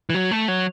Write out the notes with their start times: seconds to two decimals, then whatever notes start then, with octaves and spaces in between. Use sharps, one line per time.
0.10 E3
0.14 F#3
0.31 A3
0.48 F#3